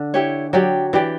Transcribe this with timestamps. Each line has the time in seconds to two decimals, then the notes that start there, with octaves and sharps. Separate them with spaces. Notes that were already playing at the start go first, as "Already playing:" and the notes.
Already playing: D3
0.14 E4 G4 C#5
0.53 F#3 D4 G4 D5 G5
0.93 E3 D4 G4 D5 G5